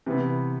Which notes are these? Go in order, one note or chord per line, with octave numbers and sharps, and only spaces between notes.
C3 E3 B3